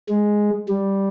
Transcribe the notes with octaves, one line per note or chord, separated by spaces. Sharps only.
G#3
G3